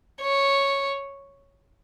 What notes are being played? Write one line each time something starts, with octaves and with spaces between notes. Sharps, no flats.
C#5